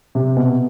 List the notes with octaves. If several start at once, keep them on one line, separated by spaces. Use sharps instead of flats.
C3
B2